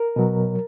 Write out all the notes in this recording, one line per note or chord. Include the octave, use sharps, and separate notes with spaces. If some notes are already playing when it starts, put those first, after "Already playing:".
Already playing: A#4
B2 F#3